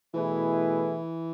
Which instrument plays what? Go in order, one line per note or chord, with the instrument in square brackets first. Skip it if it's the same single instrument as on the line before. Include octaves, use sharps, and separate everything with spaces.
[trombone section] B2 A3 E4 G#4 B4 [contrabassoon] E3